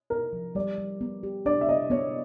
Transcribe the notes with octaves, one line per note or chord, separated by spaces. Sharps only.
D#4 A#4
F3
G3 D5
G3
B3
G4
D4 D5
E5
B3 D#5
B3 C#5